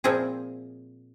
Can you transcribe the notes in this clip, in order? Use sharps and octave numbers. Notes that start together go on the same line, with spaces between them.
A#2 F3 C4 E4 G#4